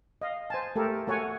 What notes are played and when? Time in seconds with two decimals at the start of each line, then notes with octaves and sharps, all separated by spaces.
0.22 D#5 F5
0.50 C5 G#5 A5
0.76 A3 G4 A4 A#4
1.07 A3 F#4 C#5 F#5 G#5